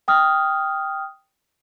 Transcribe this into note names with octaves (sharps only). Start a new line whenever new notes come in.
G5 D#6 F6